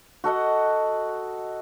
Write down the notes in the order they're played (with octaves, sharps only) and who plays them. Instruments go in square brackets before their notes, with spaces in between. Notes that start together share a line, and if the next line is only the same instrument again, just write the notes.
[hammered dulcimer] F#4 A4 D#5 F#5